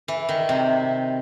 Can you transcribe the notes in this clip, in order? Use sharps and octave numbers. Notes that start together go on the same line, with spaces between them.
E3
D#3
C3